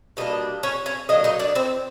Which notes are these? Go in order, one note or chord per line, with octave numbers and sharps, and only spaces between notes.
B2 G3 A#3 D4 D#5
C#4 C#5
C#4 C#5
D3 F#3 A#3 D#4 D#5
D#4 D#5
D4 D5
C4 C5